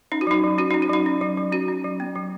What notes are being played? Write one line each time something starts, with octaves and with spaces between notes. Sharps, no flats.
C#4 D#4
F#4
F#3 D#4
F#3
C#4 F#4
C#4 D#4
F#4
F#3 D#4
C#4
F#3
F#3
C#4 F#4
C#4
F#3
B3
F#3